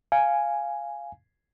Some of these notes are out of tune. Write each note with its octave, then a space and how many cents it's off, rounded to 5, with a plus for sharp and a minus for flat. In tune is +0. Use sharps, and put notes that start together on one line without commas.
F5 -10 G#5 +0